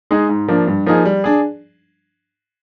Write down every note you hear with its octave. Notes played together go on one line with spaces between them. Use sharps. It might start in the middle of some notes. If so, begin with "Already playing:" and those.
G#3 D#4 G#4
G#2
F3 A#3 D4
G2
F3 A#3 D#4 G#4
G3
D4 G#4